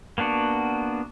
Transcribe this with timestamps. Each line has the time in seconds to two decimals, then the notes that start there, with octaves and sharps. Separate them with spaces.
0.18 A#3 B3 D4 F#4